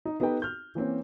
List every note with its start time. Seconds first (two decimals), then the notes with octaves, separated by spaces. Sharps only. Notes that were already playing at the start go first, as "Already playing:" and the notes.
0.05 D#4
0.20 B3 D#4 G4 A4 B4 G5
0.42 F6 G6
0.75 E3 A#3 C4 C#4